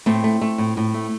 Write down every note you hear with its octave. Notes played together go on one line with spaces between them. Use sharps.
A2 A3 C4
A3
A3
A2
A2
A3